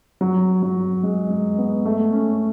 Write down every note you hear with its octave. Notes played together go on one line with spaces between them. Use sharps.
F#3
F#3
G#3
G#3
B3
A3
C#4